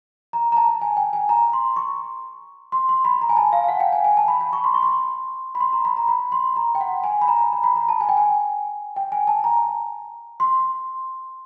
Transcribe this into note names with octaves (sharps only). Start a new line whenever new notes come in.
A#5
A#5
A5
G#5
G5
G#5
A#5
C6
C#6
C6
C6
B5
A#5
G#5
A5
F5
F5
F#5
G5
G#5
G#5
A5
B5
B5
C#6
C6
C#6
C6
B5
C6
A#5
B5
A#5
B5
C6
A#5
G5
F#5
G#5
B5
A#5
A#5
B5
A#5
A5
G#5
G5
G#5
G5
G#5
A5
A#5
C6